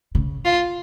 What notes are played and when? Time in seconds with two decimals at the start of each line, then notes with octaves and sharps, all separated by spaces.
0.15 C#3
0.45 F4